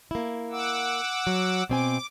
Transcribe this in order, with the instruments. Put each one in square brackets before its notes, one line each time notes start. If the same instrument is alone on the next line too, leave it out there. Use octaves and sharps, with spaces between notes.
[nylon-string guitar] A#3 E4
[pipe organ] F#5 D6 E6
[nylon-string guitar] F#3
[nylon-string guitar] B2 C4 G#5 [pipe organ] D6